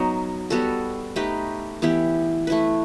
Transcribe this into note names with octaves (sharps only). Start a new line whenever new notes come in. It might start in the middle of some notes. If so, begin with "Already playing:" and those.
Already playing: F#3 B3 D#4
G3 B3 F#4 A4
A3 D#4 G4 B4
E3 B3 E4 G4
A3 E4 B4